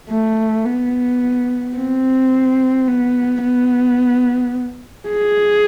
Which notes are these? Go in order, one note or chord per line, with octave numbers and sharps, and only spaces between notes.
A3
B3
C4
B3
B3
G#4